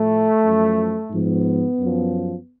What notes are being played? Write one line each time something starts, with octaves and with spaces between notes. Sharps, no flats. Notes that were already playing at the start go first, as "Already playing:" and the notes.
Already playing: A2 F3 A3
F#2 F3
G#2 F3 B3
F#2 F3